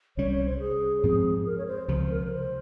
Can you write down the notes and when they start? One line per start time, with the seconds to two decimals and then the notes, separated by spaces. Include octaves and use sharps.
0.17 C2 C3 G3 C#4 C#5
0.31 C#5
0.46 C5
0.60 G#4
1.03 G#2 F3 C4
1.46 A#4
1.58 C#5
1.67 C5
1.88 C#2 C3 F3 C5
2.10 A#4
2.27 A#4
2.31 C5